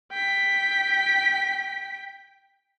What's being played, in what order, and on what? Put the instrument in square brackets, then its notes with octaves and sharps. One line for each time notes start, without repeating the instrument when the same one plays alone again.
[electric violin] G5 B6